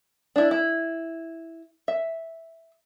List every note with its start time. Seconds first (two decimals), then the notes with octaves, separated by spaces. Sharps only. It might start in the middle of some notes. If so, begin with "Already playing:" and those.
0.36 D4 E4
0.51 E4
1.88 E5